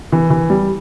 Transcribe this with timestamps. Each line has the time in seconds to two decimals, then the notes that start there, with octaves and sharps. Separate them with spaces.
0.12 E3
0.30 E3
0.50 G3